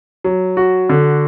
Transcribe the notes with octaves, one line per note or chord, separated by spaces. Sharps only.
F#3
F#4
D3